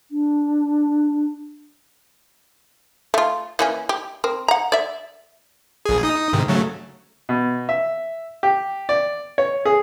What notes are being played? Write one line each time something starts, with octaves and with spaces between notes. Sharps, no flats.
D4
A3 F4
E3 A#3 C#4
G4
C4 A#4
F#5 A#5
D5 E5
A#1 G#4
D#4 D#6
G#2 C3 D#3
C#3 F#3 A3
B2
E5
G4
D5
C#5
G#4